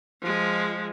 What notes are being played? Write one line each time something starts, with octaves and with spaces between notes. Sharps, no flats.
F3 G#3